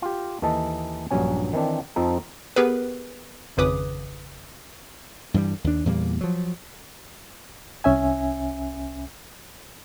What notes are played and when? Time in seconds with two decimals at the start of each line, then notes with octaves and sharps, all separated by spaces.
0.02 F4 G4
0.42 D#2 E3 A4 D#5 A5
1.11 A#1 G2 F#3 C#4 G#5
1.53 D#3 E3 C4 D4
1.96 F2 F3 C4 D#4 A4
2.56 B3 G4 G#4 A#4 B4
3.57 G#1 F2 C#3 B4 D6 D#6
5.34 G2 E3 F#3 G3
5.64 D#2 D4
5.86 E2 A#2 G3 A#3
6.21 F3 F#3
7.84 C2 C#4 E5 G#5